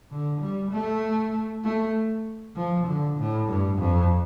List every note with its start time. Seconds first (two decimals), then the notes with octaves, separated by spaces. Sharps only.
0.11 D3
0.41 G3
0.71 A3
1.64 A3
2.56 F3
2.87 D3
3.18 A2
3.48 G2
3.79 F2